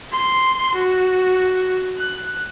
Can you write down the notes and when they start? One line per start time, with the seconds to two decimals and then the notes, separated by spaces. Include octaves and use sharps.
0.12 C6
0.74 F#4
1.98 F#6